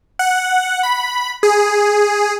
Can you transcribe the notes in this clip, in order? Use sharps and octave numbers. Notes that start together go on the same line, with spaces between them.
F#5
B5
G#4